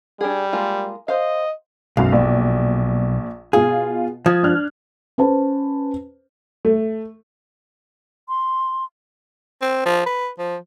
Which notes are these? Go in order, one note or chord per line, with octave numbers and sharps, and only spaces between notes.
G3 D4 G#4
G#3 A#3 F4
C5 D#5 F5
B1 F#2 F5
A#1 D5
B2 F4 G#4
F3 D#6 G#6
D4 F6 F#6
C#4 B4 C5 A5
A3
C6
C4
F3
B4
F3